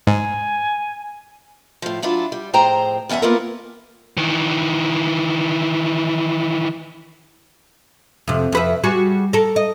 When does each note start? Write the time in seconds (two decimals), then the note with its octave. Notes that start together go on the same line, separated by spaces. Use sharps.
0.07 G#2 G#5
1.82 A2 F3
2.02 F#3 D4 E4 F4
2.32 G3
2.53 F2 A2 G#4 C5 G5 A#5
3.09 E2 G2 C#4 E5 F#5
3.22 A#3 B3 E4 F4 A4 A#4
4.17 D#3 E3
8.28 F2 C3
8.52 F2 B4 E5
8.84 G3 F#4 G#4
9.33 A4 A#4
9.56 D#5